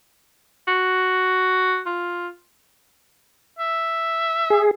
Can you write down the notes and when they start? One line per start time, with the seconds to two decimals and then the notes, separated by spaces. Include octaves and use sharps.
0.68 F#4
1.86 F4
3.59 E5
4.50 G#4